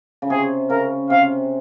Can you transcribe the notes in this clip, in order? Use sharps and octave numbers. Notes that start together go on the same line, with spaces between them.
C#3
C3 G#4
C#3 A#4
C3 F5